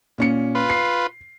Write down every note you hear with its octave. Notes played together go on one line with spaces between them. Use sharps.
A#2 C#4 C#7
F4 B4
C7